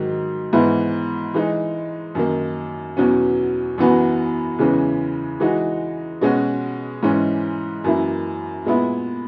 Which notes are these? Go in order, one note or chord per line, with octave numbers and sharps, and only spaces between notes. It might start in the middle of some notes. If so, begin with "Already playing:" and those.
Already playing: G#2 D#3 F#3
G#2 E3 B3 E4
E3 G#3 D#4
F#2 D#3 A#3
E2 B2 F#3 C#4
F#2 E3 B3 F#4
E2 C#3 E3 G#3 C#4
E3 G#3 D#4 F#4
B2 G#3 C#4 F#4
G#2 E3 G#3 C#4
F#2 E3 A#3 E4
A#2 G#3 B3 E4